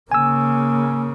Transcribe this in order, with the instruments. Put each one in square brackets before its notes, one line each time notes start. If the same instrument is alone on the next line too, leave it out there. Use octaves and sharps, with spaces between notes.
[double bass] C#3 A#3 [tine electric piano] G#5 E6